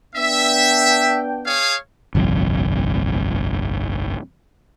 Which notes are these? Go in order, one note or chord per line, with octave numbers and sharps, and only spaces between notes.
B3 D4 E5 G5
G#4 C#5 F5
G1 C2 F2